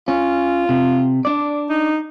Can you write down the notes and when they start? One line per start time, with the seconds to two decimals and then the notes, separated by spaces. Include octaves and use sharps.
0.08 C#4 F4
0.69 C3
1.25 D4 D5
1.70 D#4